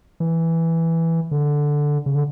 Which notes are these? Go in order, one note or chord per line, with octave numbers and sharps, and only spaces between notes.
E3
D3
C#3
D3